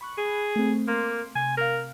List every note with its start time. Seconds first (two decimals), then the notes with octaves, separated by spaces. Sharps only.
0.01 B5 C#6 F#6
0.18 G#4
0.56 A3 C4
0.88 A#3 C6 D6
1.35 C3 G#5
1.57 A#4 F5 F#6